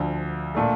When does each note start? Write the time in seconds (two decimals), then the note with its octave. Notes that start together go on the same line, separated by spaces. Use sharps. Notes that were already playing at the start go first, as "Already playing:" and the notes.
Already playing: D2 D3 F3
0.55 A#2 A3 D4 A4